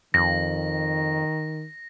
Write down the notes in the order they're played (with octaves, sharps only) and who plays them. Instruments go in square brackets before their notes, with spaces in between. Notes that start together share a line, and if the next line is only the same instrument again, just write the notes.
[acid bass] F2 [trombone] D#3 [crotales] A#6